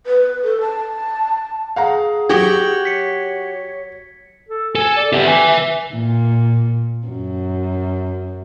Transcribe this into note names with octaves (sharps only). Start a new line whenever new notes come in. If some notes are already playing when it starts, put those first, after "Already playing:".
B4
A4
A5
G#4 F5 F#5 A#5
F#3 F#4 G4 G#6 A#6 G7
C#5 B6 C#7
A4
A4 G#5
D5
B3 G4 E5
B4 G#5
E5
A#2
F#2